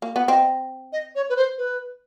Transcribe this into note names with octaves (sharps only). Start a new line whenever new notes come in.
A#3
B3
C4 D#5
D#5
C#5
B4
C5
B4